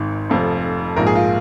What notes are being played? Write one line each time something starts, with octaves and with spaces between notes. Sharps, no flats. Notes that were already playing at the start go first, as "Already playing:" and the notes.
Already playing: G#1 G#2 D#3
F1 F2 F3
A#1 G#2 F3 A#4
G#4
F4